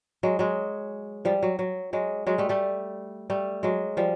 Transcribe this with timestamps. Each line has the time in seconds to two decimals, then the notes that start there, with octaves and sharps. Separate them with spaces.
0.23 F#3 G#3
0.39 F#3 G#3
1.25 F3 G3
1.43 F#3
1.59 F#3
1.93 F#3 G#3
2.27 F#3 G#3
2.38 G3 A3
2.49 G3 A3
3.30 G3 A3
3.63 F#3 G#3
3.97 F3 G3